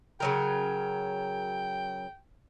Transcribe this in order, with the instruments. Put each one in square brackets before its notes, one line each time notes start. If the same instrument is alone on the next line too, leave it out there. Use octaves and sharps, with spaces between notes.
[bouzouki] C#3 F#3 A#4 [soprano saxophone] G5